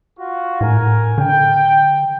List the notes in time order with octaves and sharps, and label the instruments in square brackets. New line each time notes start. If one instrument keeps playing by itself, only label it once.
[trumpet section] F4 F#4
[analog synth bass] A2 [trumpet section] A#4 G#5
[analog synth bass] D3 [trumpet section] G5